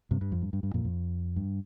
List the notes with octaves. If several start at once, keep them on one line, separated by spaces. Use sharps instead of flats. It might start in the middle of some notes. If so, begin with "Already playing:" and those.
G2 C3
G2
F2
G2
G2
G2
F2 A#2
F2
G2